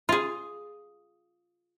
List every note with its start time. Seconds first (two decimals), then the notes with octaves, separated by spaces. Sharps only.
0.09 F4 G#4